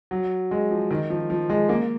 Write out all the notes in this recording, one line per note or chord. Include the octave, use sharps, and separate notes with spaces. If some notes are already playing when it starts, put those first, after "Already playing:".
F#3
G#3
F3
D#3
F3
F3
G#3
A#3